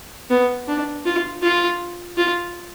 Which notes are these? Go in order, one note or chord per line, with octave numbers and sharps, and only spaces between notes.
B3
D4
F4
F4
F4